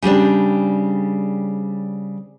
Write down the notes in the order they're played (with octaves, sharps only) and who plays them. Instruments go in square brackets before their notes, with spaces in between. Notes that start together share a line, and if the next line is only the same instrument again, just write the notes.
[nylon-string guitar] C#3 G3 C4 D4